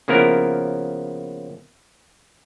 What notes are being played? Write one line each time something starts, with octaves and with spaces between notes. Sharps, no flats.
C#3 F3 A#3 B3 E4 A#4